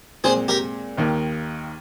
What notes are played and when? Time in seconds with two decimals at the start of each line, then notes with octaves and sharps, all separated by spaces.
0.24 A#2 G#3 C4 G#4 C5
0.48 G4 A#4
0.97 D#2 D#3 A#3 D#4